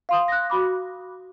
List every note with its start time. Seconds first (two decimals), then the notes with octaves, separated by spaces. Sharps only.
0.09 F5 C6 D#6
0.28 F#6 A#6
0.50 F#4 B5 D6